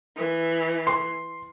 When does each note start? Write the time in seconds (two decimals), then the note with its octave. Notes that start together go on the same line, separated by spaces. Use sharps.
0.17 E3
0.87 C6